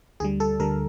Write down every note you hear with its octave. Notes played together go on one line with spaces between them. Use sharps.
D2 D3 G3 G#4
A4
D2 D3 G3 A#4